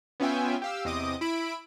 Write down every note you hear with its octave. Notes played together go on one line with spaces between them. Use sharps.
B3 C#4 F4 E5 G5 G#5
G4 F5 E6
E2 C3 D#5 D6 D#6
E4 B5 D7